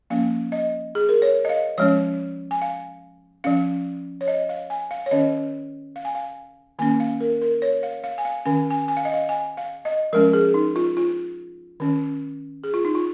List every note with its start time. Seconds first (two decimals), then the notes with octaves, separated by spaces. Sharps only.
0.10 F3 A#3 C#4 F5
0.52 D#5
0.95 G#4
1.09 A#4
1.22 C#5
1.45 D#5
1.49 F5
1.78 F3 G#3 C#4 C#5
2.51 G#5
2.62 F5
3.44 F3 C#4 F5
4.21 C#5
4.28 D#5
4.49 F5
4.70 G#5
4.91 F5
5.06 C#5
5.11 D#3 C#4 D#5
5.96 F5
6.05 G#5
6.15 F5
6.79 D#3 A#3 C#4 G#5
7.00 F5
7.20 A#4
7.41 A#4
7.62 C#5
7.83 F5
8.04 F5
8.18 G#5
8.25 F5
8.45 D#3 C#4 G#5
8.71 G#5
8.88 G#5
8.97 F5
9.05 D#5
9.14 F5
9.29 G#5
9.57 F5
9.85 D#5
10.13 F3 G#3 C#4 A#4
10.33 G#4
10.54 D#4
10.76 F4
10.97 F4
11.80 D#3 C#4
12.64 G#4
12.74 F4
12.85 D#4
12.95 F4